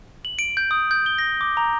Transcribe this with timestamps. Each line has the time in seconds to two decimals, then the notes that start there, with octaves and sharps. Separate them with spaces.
0.25 F#7
0.39 D7
0.57 G6
0.71 D#6
0.91 G6
1.06 G7
1.18 A#6
1.41 D6
1.57 A#5